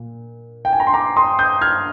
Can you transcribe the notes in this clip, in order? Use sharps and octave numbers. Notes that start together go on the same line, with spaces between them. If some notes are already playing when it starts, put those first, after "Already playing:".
Already playing: A#2
G5
G#5
A#5
C6
A#5 D6
C6 D#6
D#6 G6
F6 G#6